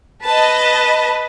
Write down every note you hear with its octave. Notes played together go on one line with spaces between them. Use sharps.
B4 D#5 A5